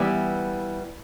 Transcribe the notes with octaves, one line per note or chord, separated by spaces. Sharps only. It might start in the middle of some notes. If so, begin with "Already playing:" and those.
Already playing: E3 G3 B3 E4